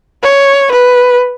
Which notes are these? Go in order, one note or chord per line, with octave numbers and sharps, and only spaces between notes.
C#5
B4